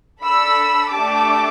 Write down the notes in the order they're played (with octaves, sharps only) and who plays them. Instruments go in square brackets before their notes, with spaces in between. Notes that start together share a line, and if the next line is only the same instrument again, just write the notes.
[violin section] D4 A4 B5 E6
A3 D4 G4 A5 D6